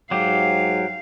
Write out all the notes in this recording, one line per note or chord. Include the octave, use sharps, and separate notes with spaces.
G#2 F#3 G4 F5